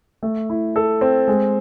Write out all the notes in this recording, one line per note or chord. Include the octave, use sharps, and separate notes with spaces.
A3
E4
A4
C4
G#3